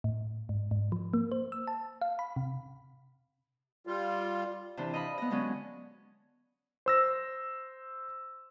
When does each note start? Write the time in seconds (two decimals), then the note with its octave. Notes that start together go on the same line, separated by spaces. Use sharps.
0.04 A2
0.49 G#2
0.71 G#2
0.92 F3
1.14 A#3
1.32 C5
1.52 E6
1.67 A5
2.02 F5
2.19 B5
2.36 C3
3.87 G3 F4
4.77 C3 E3 D4 C5
4.94 D#5 F5 B5
5.18 B3 D#5
5.30 D3 F#3 G#3 B3 C#4
6.86 C5 E6 A#6